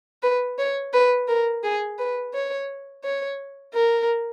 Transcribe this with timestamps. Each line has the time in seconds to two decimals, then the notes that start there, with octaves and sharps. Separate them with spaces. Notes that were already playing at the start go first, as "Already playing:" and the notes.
0.23 B4
0.58 C#5
0.93 B4
1.28 A#4
1.63 G#4
1.99 B4
2.34 C#5
3.04 C#5
3.74 A#4